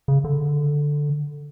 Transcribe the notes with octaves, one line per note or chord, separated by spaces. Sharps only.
C#3
D3